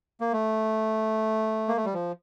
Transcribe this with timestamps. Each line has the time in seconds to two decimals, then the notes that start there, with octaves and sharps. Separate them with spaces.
0.21 A#3
0.33 A3
1.68 A#3
1.77 A3
1.85 G3
1.94 F3